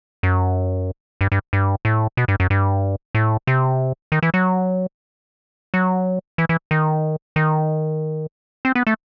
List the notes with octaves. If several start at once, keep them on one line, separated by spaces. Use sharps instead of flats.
F#2
G2
G2
G2
A2
B2
G2
F#2
G2
A2
C3
D#3
E3
F#3
F#3
E3
E3
D#3
D#3
C4
B3
A3